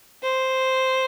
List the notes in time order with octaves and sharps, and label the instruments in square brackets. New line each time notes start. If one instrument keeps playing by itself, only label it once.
[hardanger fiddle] C5